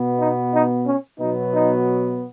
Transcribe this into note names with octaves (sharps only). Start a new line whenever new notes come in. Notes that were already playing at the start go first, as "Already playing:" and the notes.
Already playing: B2 B3
D#4
D#4
C#4
B2 F#3 B3 D#4
D#4